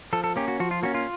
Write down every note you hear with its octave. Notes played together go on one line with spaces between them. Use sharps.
F3 A4
A4
A#3 C#4 G4
F#4
F3 F#4
F4
A#3 C#4 F#4
F4